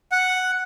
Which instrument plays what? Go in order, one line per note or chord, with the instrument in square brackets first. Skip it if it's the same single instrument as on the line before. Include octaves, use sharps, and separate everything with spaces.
[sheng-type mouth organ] F#5